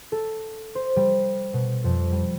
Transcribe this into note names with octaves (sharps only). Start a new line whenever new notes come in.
A4
C5
G3
B2
F2
G3